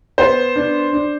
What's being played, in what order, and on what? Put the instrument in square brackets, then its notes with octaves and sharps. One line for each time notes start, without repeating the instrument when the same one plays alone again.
[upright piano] B3 C5
D4
D4